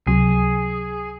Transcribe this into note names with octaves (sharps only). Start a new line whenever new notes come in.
C#2 C3 F#3 G#4